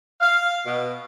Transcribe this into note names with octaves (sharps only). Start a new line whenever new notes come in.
F5
B2